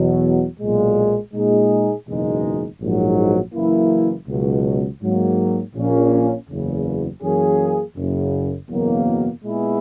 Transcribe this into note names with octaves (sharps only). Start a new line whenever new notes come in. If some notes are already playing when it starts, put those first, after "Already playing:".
Already playing: E2 B2 F#3
B1 A#2 G#3
A#2 G#3 D#4 G#4
F#1 E2 B2 G#3 D#4
A#1 G#2 F#3
F#1 F#2 E3 A#3 E4
C#2 B2 F#3
G#2 F#3 A#3
A#1 A#2 A#3 C#4
F#1 E2 C#3
F#2 E3 A#3 C#4 G#4
F#1 F#2 C#3
F#1 E2 B2 F#3 A#3
A#2 G#3 B3 E4 G#4